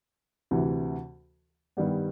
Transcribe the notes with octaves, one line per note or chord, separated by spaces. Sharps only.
D2 C3 E3
G2 D#3 G3 B3